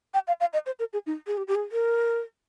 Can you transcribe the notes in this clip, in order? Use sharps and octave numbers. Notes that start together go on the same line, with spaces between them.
G5
F5
F5
D#5
C5
A#4
G#4
D#4
G#4
G4
G4
G#4
A#4